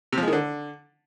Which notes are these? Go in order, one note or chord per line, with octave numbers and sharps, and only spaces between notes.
C3
F3
G#3
D#3
D3